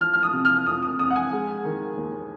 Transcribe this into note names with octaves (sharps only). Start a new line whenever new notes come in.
F3 F6
F6
D#6
C3
F6
F2 D#6
D#6
F2 D#6
F#5
G#5
G#3
D#3
D#2